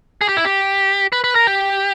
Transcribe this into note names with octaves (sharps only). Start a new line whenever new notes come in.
G#4
G4
E4
G4
B4
B4
A#4
G4